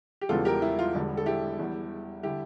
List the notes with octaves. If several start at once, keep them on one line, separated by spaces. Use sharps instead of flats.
G4
E1 E2 C#3 E3 G3 F4 A4
G4 A#4
E4
F4
E1 E2 D3 G3
A4
E4 G4
E2 E3 G3
D3 G3 E4 G4